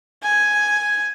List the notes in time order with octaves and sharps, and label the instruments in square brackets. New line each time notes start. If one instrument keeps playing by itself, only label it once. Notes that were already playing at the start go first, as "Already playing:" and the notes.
[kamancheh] G#5